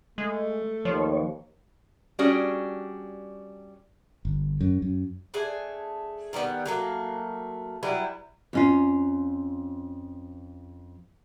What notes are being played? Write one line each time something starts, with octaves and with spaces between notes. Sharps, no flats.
G#3 A3
D#2 F3 C#5
G3 C#4 D4 F#4 G#4
G1
F#2
F#2
A3 D4 G#4 G#5
D#3 G3 A#3 B3
F#3 A3 A#3
F#3 G3 E4 B4
F2 C#4 F4